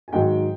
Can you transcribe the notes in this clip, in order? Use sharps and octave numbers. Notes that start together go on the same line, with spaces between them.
G#5
G#2 D#3 F#3 G5